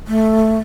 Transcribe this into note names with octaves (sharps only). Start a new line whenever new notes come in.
A3